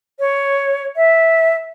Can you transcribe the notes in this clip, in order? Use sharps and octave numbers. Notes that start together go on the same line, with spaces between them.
C#5
E5